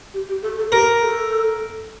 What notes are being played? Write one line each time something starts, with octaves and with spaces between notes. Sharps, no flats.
G4
G4
A4
A4
G4 A#4
A4